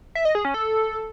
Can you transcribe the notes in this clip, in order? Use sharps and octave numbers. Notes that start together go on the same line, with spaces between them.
E5
D#5
G#4
C#4
A4